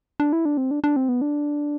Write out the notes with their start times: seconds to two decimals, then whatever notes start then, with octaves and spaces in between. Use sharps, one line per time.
0.20 D4
0.33 E4
0.45 D4
0.57 C4
0.71 D4
0.84 D4
0.96 C4
1.09 B3
1.22 D4